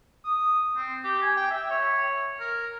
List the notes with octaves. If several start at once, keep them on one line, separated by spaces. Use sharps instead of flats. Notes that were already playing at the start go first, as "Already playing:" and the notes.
D#6
C4
G4
G#5
G5
E5
C#5
A#4